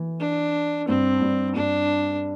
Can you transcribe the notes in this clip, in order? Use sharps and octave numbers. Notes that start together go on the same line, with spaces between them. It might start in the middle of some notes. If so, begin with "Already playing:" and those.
Already playing: E3
D4
G2 C4
G2
G2 D4